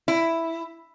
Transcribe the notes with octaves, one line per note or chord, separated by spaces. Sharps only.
E4